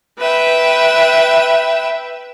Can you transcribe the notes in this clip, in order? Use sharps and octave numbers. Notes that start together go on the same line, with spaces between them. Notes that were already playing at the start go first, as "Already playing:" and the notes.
B4 E5 G5